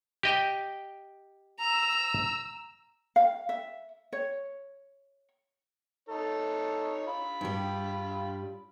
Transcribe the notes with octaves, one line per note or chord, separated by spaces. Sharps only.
G4 D#5 G5
A#5 E6
F5
E5
C#5
D#4 A4 C#5
F4 B5
G2 G3